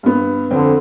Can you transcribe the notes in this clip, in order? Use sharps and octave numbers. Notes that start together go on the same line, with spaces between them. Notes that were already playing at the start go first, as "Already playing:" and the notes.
G2 B3
F2 D3 C4